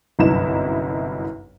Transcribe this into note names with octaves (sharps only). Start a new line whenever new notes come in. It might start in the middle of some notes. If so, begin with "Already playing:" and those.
G1 C2 F#2 D#4 E4 E7